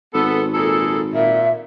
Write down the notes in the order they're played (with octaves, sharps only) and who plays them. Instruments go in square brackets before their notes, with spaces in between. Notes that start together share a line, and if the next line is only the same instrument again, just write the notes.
[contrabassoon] G#1 [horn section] B3 A4
[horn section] A#2 G#4 A4
[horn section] A#2 [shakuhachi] E5